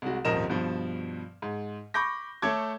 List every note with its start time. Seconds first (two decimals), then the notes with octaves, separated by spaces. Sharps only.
0.02 C2 G#3 F#4
0.25 D#1 G#1 F3 A#4 D#5 E7
0.50 G2 B2 F3
1.42 G#2
1.94 B5 C#6 D6 G6 A#6
2.42 A3 A4 C#5 D6 G#6